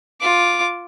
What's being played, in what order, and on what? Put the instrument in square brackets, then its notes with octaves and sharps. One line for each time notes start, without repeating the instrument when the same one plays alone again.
[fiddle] F4 D6